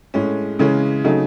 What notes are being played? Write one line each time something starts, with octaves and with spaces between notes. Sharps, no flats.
A2 G#3 C#4
C#3 E3 G#3 C#4 G#4
C#3 F#3 A3 D#4